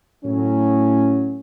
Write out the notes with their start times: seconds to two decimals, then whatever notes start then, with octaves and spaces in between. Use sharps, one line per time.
0.24 A2 F#3 C#4